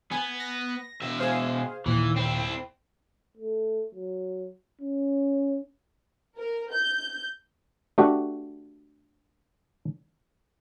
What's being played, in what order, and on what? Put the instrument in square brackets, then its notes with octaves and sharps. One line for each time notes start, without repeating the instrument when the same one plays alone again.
[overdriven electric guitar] B3 [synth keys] G#5
[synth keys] A#6
[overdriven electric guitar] B2 E5
[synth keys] G#4 C5 F5
[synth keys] D#2 A#2 [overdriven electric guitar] E3
[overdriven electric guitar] C4 E4
[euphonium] A3
F#3
C#4
[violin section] A#4
G6
[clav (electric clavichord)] A3 D4 F#4 G4 F#5